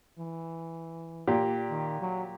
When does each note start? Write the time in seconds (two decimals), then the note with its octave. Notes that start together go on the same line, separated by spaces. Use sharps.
0.19 E3
1.27 A#2 G4
1.71 D#3
2.01 F#3